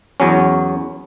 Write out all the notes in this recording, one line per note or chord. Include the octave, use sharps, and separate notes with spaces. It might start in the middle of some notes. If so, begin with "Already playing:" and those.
E2 F#3 C#4